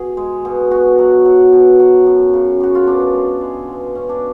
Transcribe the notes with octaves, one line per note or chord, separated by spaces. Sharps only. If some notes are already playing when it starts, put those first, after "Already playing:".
Already playing: B2 G#4
G#3
B2
B2 F#4
F#3
F#3
B2
F#3
F#2
C#3
F#2 F#4
F4
B2 D4
G#3
G#3
B2
B2 C#4
D4